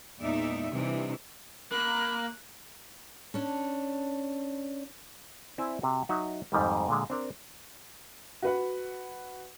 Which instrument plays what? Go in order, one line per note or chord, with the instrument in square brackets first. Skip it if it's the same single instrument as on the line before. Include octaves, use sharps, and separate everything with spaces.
[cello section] E2 A#2 G#3 D#4 D5 E5
C3 E3 G3 D4 D#4
[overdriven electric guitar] A#3 [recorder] B5 [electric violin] F#6
[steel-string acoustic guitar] C#4 D4
[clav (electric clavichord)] C4 E4 D5 E5 G#5
C3 F#4
F#3 D#4 F#4 E5 F#5
F2 G#2 D#3 G3
A#2 D3 G#3
C4 D4 A#4
[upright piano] F#4 B4 F#5